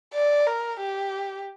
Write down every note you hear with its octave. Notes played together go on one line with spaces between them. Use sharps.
D5
A#4
G4